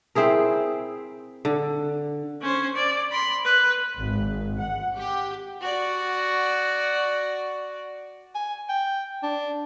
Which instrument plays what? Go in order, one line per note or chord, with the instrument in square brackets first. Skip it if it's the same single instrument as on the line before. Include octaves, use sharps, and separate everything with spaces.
[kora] C4 E4 G#4 A#4
D3
[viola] C#4 C5
D5
B5 C6
B4
[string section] G#1
F#5
G4
[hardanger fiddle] F#4 D5
[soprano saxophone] G#5
G5
D4